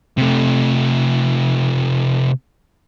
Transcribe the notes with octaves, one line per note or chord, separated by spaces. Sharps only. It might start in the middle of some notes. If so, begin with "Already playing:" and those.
C3 A3